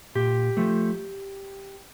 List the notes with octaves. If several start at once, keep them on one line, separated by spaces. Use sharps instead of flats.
A#2 G4
F3 A3